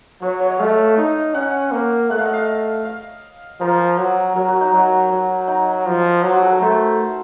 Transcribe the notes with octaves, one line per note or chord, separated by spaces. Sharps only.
F#3 C#5
C#5
D#5
A3 F5
D#4
C#4 F#5
A#3
A3 F#5
F5
D#5
F5
F5
F3 A#4
F#3
F#3 A#4
F#4
D#4
F#3
F#3
D#4
F3
F#3 F4
F#4
A4
A#4
A3 C5